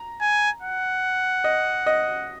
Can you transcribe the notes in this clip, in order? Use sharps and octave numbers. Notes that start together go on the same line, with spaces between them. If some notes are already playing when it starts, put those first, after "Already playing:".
Already playing: A#5
G#5
F#5
D#5
D#5